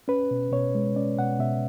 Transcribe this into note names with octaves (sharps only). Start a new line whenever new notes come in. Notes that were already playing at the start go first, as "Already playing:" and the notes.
C#4 B4
B2
B2 C#5
G#3
C#4 D5
B2 F#5
B2 E5